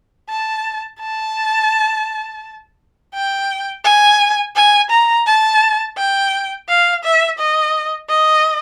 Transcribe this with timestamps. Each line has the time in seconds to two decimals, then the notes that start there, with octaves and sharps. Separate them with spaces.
0.29 A5
1.00 A5
3.14 G5
3.85 G#5
4.56 G#5
4.90 A#5
5.27 A5
5.97 G5
6.69 F5
7.04 E5
7.39 D#5
8.10 D#5